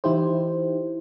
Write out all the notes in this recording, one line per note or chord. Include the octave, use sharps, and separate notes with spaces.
E3 D#4 E4 G4 C5